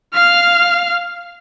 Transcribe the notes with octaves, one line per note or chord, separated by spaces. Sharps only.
F5 F6